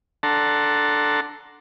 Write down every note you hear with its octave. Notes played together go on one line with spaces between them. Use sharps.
D4 A4 F#5 A5 A#5 C6